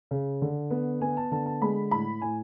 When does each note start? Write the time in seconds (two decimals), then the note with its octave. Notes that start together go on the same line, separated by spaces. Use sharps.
0.11 C#3
0.42 D3
0.70 B3
1.01 B3 G#5
1.17 A5
1.31 D3 A5
1.46 A5
1.62 G#3 B5
1.91 A2 B5
2.21 A2 G#5